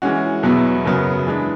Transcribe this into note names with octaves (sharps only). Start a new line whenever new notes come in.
E3 G#3 C#4 F#4
E2 B2 F#3 B3 E4
F#2 C#3 F#3 B3
E3 G#3 B3 D4